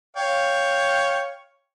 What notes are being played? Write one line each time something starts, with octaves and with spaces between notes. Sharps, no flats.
C#5 F5 G5